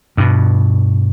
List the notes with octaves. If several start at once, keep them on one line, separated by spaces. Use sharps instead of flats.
G2 B2